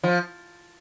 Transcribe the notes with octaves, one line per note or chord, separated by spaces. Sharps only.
F3